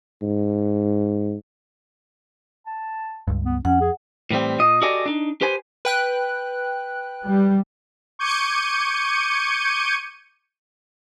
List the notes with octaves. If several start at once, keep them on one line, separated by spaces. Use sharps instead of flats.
G#2
A5
C#2 G2
B3
F2 C#4 F#5
G#4
A2 E3 G3 C4
A#2 D#5
F#4 G4 A4 D5 D#5 G#5
D4 D#4
G4 B4 C5 G#5
B4 G5 F#6
G3
C#6 D6 G6 G#6 C#7 D#7